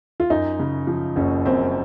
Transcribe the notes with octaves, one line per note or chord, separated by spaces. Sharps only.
F4
F#2 D#4
C#3
F3
F#1 C#4
F#2 C4